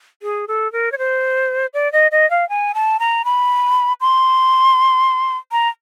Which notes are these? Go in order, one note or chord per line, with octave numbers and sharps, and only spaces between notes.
G#4
A4
A#4
C#5
C5
D5
D#5
D#5
F5
G#5
A5
A#5
B5
C6
A#5